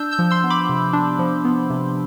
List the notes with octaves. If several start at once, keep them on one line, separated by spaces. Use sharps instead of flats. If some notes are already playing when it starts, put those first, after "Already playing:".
Already playing: D4 E6 G6
E6 G6
F3
C6 E6
B3
B5 D6
C3
D4
F3
B3
C3